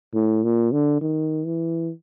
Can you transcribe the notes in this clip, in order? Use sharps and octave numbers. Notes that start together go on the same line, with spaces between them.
A2
A#2
D3
D#3
E3